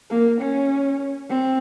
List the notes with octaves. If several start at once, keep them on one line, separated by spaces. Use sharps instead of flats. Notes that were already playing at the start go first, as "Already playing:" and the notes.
A#3
C#4
C4